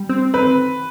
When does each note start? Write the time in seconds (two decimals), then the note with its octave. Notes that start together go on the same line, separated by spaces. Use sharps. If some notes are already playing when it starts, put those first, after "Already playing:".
Already playing: G3
0.09 C4
0.34 C4 B4